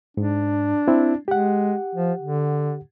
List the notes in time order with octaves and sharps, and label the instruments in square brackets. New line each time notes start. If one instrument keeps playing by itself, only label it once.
[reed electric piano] G#2 [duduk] D4
[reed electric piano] C4 E4
[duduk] G#3 [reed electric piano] G4 F#5
[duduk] F3
D3